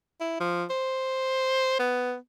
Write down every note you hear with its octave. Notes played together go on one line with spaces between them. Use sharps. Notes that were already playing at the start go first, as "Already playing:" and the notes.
E4
F3
C5
B3